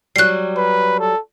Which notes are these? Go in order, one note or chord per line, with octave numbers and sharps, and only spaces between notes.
F#3 G3 F#6 C7
B4
A4